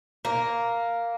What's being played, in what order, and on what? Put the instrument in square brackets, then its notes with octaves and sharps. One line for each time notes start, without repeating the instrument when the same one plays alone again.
[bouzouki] A#3